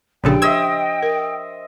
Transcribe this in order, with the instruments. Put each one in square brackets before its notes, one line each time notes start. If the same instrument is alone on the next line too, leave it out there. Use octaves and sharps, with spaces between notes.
[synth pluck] A#1 C#3 A4 [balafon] F3 D4 G4 [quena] G5
[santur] C5 D#5 E5 [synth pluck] E6 G#6
[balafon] A#4